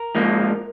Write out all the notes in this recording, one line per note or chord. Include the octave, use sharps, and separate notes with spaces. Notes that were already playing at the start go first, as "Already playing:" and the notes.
Already playing: A#4
G#2 F3 A#3